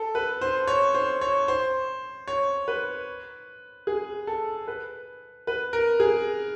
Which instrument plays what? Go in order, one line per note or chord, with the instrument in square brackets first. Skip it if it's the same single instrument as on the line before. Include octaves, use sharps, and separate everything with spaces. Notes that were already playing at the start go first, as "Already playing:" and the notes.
Already playing: [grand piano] A4
B4
C5
C#5
C5
C#5
C5
C#5
B4
G#4
A4
B4
B4
A#4
G#4